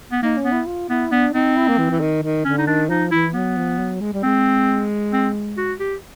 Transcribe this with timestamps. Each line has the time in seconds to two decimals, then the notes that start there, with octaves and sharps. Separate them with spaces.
0.12 B3
0.23 A#3 D#4
0.37 C#4
0.45 B3
0.52 E4
0.67 F4
0.89 B3 E4
1.11 B3 D4
1.34 C4 D#4
1.57 E4
1.68 A#3
1.78 E3
1.90 E3
2.00 D#3
2.23 D#3
2.45 D3 C#4
2.59 D#4
2.67 D#3 D4
2.90 F3 D#4
3.12 E3 E4
3.34 F#3 B3
3.58 F3
3.79 F#3
4.01 G#3
4.14 G3
4.23 G#3 C4
5.13 C4
5.58 F#4
5.80 G4